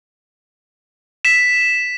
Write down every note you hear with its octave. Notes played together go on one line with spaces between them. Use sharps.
B6 E7